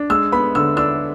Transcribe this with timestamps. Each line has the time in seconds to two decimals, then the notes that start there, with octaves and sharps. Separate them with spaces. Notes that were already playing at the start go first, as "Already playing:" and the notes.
Already playing: D4
0.10 G#3 E6
0.32 B3 B5
0.55 D3 E6
0.77 D4 E6